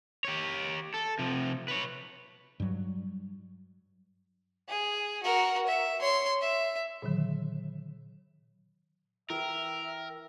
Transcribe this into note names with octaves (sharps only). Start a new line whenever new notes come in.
G4 C#5
A4
C3 F3
B4 C#5
G2 F#3
G#4
F#4 A#4
E5
C#5 C6
E5
A#2 D3 D#3 F#3
E3 A#4 E5 G5